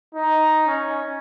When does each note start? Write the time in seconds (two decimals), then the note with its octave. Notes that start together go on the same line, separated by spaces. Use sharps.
0.14 D#4
0.67 C#4